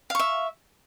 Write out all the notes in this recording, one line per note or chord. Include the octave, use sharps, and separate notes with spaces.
E5 F5 C#6